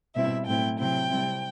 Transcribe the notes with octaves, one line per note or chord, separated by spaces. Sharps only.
B2 G3 C4 E4 E5
A2 F#3 A3 C4 E4 G5
C3 F#3 C4 E4 G5
C3 G3 C4 E4